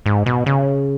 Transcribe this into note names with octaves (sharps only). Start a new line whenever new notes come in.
G#2
B2
C#3